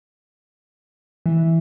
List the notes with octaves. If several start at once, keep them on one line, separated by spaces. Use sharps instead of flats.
E3